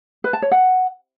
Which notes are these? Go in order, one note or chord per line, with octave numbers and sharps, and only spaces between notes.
B4
A5
C#5
F#5